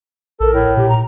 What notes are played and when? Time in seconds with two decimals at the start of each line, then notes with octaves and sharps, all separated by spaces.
0.40 A#1 A4 A#4
0.53 A2
0.77 A#2 G4
0.89 A#5